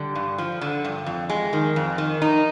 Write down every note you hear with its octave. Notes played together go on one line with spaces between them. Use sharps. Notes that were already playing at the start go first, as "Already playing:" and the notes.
Already playing: D3 G3
G2
F3
D3
G2
F2
G#3
D#3
F2
D#3
D#4